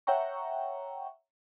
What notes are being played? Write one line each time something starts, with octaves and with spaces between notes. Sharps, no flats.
C#5 E5 F#5 G5 A#5 C#6